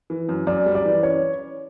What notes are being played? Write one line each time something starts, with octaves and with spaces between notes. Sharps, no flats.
E3
F#2
F#2 D5
G3
D5
E3
C#4 C#5